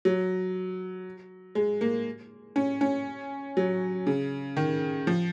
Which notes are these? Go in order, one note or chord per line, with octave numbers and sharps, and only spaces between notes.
F#3
G#3
A#3
C#4
C#4
F#3
C#3
D#3
F3